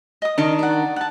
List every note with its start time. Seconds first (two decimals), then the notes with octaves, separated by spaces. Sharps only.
0.22 D#5 D#6
0.38 D#3 D4 D#5 C#6
0.59 D5 F#5
0.96 F#5 A5